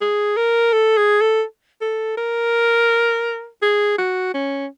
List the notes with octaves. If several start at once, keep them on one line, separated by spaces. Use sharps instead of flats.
G#4
A#4
A4
G#4
A4
A4
A#4
G#4
F#4
C#4